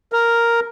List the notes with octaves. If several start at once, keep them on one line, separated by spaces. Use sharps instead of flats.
A#4